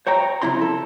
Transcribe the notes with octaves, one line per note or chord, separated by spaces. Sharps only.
C5 C#5 G5 A#5
C#3 F3 C4 E4 A#5 C6
A4